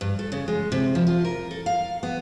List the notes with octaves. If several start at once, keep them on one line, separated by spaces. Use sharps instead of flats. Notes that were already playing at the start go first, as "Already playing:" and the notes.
G2
A4
C#3
G#3
C3
F3
F4
A#4
A4
F5
B3